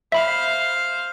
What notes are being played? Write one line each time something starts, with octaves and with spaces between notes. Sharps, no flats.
C5 E5 F5 B5